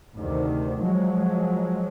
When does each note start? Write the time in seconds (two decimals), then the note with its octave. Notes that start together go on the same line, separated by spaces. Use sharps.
0.15 D2 C3 D#3
0.81 F3 F#3 G#3